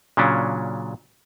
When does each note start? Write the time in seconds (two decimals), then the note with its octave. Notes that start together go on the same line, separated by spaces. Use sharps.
0.17 A#2 C#3 F#3 C#4 D4